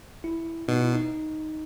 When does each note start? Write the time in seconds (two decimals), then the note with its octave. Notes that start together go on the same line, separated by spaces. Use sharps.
0.24 E4
0.68 B2 D#4
0.81 E4
0.93 D#4